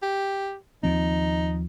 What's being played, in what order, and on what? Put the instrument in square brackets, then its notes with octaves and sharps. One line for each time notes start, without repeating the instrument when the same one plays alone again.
[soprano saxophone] G4
[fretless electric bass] D#2 F3 C4 [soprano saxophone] D#4